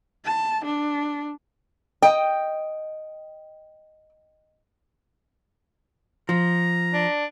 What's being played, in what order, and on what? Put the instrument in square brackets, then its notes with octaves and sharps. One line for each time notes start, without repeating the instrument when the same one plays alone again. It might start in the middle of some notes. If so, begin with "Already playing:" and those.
[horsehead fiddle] A5
D4
[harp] D#5 [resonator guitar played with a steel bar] G5
[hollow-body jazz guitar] F3 [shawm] A#5
[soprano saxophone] D4